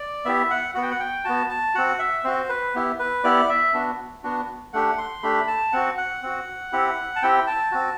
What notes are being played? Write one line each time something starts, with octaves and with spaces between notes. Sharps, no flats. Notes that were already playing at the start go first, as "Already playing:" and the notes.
Already playing: D5
B3 E4 G4 E5
F#5
B3 F#4 F#5
G5
F#5
G5
B3 F#4 A5
A5
C4 F#4 F#5
E5
C4 F#4 C5
B4
B3 E4 G4
B4
B3 E4 G4 D5
E5
B3 D4 F#4
B3 D4 F#4
A3 D4 G4 F#5
C6
A3 D4 G4 B5
A5
C4 F#4 F#5
F#5
C4 F#4
C4 E4 G4
A5
C4 E4 G4 G5
A5
C4 F#4